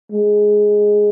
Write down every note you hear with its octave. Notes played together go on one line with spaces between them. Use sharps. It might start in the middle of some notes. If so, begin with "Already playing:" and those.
G#3